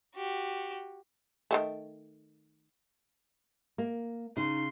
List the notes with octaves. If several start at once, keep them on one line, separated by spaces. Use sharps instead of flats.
F#4 G4
D#3 G3 A3
A#3
C#3 D#4 C6